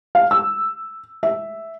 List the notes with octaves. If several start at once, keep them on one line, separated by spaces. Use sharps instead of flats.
F5
E6
E5